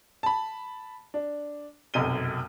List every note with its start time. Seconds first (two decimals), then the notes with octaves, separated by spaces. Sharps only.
0.23 A5 B5
1.14 D4
1.94 F1 B1 F#2 D#7 G7